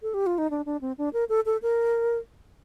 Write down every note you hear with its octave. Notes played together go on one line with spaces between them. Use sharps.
A4
G4
F4
D#4
D4
D4
C4
D4
A#4
A4
A4
A#4